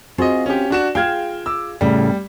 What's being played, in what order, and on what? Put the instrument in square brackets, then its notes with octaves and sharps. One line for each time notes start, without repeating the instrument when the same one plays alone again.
[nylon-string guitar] C4 F4 F#4 [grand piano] G#4 D#5
[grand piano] C#4 G4
D4 F#4 E7
[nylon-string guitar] F4 G#4 F5 [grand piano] G5 F6 G#6
[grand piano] D6 E6
[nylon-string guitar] A2 C#3 [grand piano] G3